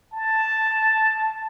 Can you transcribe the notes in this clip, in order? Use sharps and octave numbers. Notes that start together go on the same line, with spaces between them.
A5